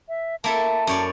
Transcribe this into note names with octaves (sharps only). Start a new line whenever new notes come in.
E5
A#3 E4 A4 A5
F#2 C#5 D5